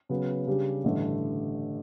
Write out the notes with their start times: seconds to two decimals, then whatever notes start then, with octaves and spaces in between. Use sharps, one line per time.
0.09 C#3 F#3 B3
0.47 C#3 G3 D4 G4
0.84 A1 G2 D3 A3